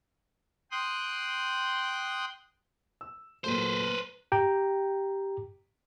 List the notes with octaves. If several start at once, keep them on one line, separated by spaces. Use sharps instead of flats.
G5 C6 D#6 F#6
E6
A#2 F#3 A3 B4 C5
G4 G5 A#5